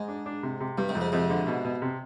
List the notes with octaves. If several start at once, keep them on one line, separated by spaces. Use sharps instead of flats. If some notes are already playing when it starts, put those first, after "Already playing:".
Already playing: G#2 G#3
D4
D4
C3
C3
G2 G3
G#2 C3
F2
G#2 C3
F2 G#2 C3
D3
B2
B2
C3